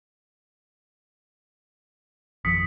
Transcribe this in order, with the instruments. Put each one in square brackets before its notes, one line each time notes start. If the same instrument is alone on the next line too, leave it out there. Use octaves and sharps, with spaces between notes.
[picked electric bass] G#1 F2 F3 [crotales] D#6 B6 C#7